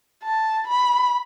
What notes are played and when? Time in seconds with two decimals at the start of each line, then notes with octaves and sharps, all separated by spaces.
0.24 A5
0.68 B5